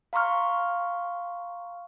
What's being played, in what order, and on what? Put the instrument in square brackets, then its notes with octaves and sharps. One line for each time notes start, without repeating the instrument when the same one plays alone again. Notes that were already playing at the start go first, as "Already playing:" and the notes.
[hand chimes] F5 A#5 C6 C#6 F6